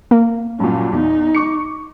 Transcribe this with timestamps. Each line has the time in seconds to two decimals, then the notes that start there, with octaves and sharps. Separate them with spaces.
0.11 A#3
0.60 G2 A#2 F#3 C#4
0.92 E2 D#4
1.35 C#6 D6 C#7